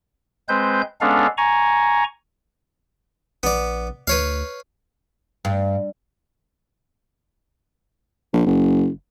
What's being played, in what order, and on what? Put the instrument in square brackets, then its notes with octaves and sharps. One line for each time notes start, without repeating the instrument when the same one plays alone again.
[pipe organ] G#3 C4 B4 C5 G6
G#3 B3 C#4 D4 A4 F5
G#5 A#5 C#6
[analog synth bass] A#1 [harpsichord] B3 D5
[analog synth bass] D2 [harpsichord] B4 C#5 F5
[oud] G2
[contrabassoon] A#1
F#1